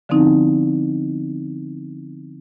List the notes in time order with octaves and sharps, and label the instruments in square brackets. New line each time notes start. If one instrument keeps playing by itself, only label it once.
[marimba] D3 F3 B3 C4 D#4 E4